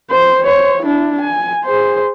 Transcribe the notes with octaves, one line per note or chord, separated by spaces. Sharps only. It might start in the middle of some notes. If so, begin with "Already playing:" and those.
C5
C5 C#5
D4 E4
G#5
G#4 C5